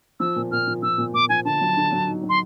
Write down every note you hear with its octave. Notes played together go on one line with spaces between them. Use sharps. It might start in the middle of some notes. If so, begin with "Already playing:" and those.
F3 E6
A#2
A#2 F6
F3
F3 E6
A#2
A#2 D6
F3 G#5
D3 A5
F#3
D3
F#3
D#4
F#3
C6